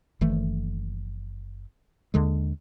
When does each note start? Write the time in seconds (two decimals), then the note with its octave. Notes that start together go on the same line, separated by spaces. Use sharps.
0.21 F#1 D#3 E3 A3
2.14 D#2 D3 G#3